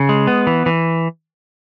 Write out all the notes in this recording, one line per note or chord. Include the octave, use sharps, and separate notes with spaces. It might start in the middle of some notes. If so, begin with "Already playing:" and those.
Already playing: C#3
G#3
B3
E3
E3